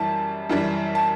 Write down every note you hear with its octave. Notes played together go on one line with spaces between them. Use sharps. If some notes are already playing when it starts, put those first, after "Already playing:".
Already playing: F#2 E3 G3 A5
F#2 E3 G3
A5